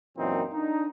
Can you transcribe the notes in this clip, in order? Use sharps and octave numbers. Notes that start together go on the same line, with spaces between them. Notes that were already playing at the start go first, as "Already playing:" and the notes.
F#2 A#2 E3 C4 D#4
D4 D#4